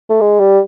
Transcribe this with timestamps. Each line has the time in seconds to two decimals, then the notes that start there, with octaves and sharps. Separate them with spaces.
0.10 A3
0.21 G#3
0.40 G3